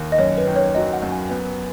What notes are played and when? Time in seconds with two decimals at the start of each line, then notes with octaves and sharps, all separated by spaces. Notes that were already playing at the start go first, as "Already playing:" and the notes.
Already playing: D#2
0.12 D#5
0.18 F#2 C#5
0.38 B4
0.47 D#3
0.56 C#5
0.75 F#3 D#5
0.93 F#5
1.02 F#2
1.12 G#5
1.30 B3